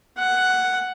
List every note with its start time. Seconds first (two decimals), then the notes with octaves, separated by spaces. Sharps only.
0.18 F#5